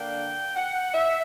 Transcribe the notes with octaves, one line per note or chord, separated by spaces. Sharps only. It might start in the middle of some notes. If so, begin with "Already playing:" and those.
Already playing: D3 A#3 D4 G5
F#5
E5